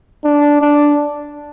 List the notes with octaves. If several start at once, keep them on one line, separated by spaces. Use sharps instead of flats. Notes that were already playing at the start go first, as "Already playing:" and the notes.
D4
D4